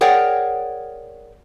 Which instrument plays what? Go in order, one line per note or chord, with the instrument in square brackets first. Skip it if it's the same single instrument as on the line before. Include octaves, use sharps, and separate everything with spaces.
[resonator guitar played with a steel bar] G#4 A#4 C#5 D5 F#5 G5